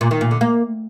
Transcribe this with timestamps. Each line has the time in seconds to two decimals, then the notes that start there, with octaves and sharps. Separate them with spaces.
0.01 A#2
0.11 D#3
0.21 A#2
0.31 D3
0.41 A#3